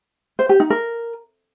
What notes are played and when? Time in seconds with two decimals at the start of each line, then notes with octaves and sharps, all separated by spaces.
0.39 C5
0.49 G4
0.60 D#4
0.70 A#4